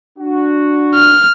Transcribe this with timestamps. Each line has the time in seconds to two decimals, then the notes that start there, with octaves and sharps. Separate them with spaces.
0.18 D4 F#4
0.95 F6